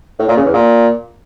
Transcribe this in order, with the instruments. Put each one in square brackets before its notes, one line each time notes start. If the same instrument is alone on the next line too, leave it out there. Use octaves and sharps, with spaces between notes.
[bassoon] A2
A#2
C#3
E2
A#2